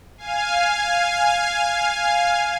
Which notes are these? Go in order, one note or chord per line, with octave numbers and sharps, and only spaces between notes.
F5 G#5